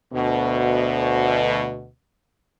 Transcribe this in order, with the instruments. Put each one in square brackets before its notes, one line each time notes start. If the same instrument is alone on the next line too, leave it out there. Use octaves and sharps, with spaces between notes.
[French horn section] D2 B2